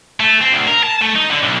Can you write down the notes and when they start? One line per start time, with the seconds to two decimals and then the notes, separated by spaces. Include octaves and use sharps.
0.20 A3
0.41 C4
0.53 D2
0.68 A#4
0.83 A5
1.01 A3
1.15 D#4
1.31 D3
1.43 B1